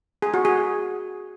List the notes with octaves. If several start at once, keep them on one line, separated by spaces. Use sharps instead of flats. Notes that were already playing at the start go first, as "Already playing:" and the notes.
G#4
F#4
G#4